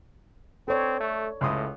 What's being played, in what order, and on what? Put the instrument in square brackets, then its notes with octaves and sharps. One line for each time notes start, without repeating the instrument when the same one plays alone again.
[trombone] C4 [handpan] A4 C#5 D5
[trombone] A3
[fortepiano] C#2 C6 D#6 [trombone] A2